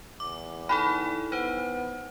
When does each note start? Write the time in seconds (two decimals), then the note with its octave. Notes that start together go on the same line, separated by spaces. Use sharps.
0.20 E2 D6
0.69 D#4 E4 A4 B5
1.32 B3 D#4 C5